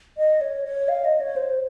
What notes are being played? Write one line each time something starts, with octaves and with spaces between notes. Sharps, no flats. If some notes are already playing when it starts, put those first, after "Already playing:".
D#5
C#5
C#5
F5
D#5
C#5
C5